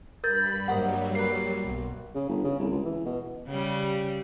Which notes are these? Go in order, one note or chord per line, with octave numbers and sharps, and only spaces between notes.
G2 A#4 B5 G6 A6
G2 F#3 G3 A#3 C5 D#5 F#5
A#3 B4 C7
B1
C#3
G1
C#3
C2
C#2
E3
B2
C#3 G3